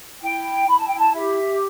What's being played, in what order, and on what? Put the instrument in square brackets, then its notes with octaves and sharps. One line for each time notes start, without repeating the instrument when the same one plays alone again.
[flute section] E4 G5
E4 B5
A5
G5
A5
G4 E5